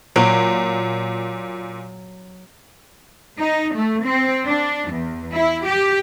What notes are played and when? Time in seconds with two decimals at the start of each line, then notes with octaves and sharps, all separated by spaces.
0.16 A#2 F#3 D7
3.38 D#4
3.74 A3
4.04 C4
4.44 D4
4.91 E2
5.33 E4
5.65 G4